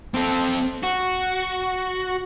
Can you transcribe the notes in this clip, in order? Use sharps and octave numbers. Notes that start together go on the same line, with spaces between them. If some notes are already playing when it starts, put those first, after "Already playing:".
C4 A4
F#4